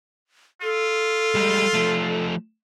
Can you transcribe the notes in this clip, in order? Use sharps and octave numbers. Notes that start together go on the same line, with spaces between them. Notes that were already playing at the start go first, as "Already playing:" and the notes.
F4 A4
G3 G#3
F3 A3